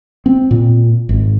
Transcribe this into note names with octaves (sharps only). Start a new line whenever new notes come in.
C4
A#2
G#1